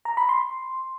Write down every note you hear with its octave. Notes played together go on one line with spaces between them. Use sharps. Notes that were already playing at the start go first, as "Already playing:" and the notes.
A#5
B5
C6